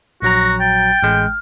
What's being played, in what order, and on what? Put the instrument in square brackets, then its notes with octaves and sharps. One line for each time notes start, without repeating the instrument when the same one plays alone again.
[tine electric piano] A#1 F#3 A#5 [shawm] F#4 [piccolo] A#6
[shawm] G5 [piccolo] A6
[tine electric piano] A1 G#3 [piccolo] F6